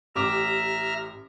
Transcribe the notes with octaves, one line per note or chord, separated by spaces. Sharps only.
A1 G4 E5 A#5 D6 F6